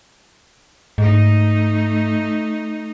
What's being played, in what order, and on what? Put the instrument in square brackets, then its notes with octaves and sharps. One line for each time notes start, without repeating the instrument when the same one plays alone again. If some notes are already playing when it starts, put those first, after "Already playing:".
[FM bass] G#2 [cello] A3 D#4